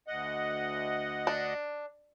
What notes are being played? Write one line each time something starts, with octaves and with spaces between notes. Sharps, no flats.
D2 D#5 F#5
D4